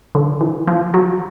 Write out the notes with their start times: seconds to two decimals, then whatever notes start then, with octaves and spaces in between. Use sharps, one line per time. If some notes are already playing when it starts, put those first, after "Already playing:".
0.15 D3
0.41 E3
0.68 F3
0.94 F#3